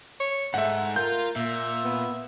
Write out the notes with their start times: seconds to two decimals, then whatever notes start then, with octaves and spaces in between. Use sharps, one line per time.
0.20 C#5
0.54 G#2 A3 E5 F#5
0.96 F4 A#4 G6
1.36 A#2 A#3 E5
1.84 B3